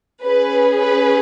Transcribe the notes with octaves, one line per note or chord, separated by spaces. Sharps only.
C#4 G#4 B4
B4